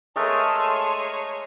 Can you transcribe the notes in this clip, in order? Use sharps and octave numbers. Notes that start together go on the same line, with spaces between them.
G#3 A3 G#4 A#4 C#5 A5 C6